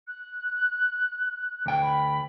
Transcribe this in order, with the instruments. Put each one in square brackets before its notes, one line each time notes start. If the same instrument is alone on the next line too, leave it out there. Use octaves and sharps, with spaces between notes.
[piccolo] F#6
[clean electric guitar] D2 G5
[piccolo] B5